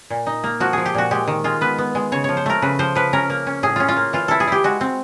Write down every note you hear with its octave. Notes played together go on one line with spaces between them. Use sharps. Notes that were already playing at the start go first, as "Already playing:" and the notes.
A#2
D#4
A#3
F3 F#4
F3 G#4
G4
A#2 F#4
G#3 G4
D#3
G#3 F4
B3 B4
B3
G#3
C#3 C#5
F3 C#5
C5
A3 A#4
C#3 B4
F3 C5
F3 B4
C#4 A#4
A#3
C#4
A2 G#4
C#4 F4
F4
A#3
E3 F4
E4 A4
G#4
E4 G4
G#3 F#4
C4